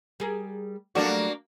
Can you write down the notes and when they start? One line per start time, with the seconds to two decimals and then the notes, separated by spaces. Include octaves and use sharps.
0.20 G3 G#4 A#4
0.95 F#3 G3 A3 A#3 D4 F#4